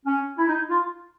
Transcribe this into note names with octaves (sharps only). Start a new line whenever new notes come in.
C#4
E4
D#4
F4